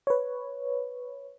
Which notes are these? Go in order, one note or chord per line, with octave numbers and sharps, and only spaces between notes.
B4 C#5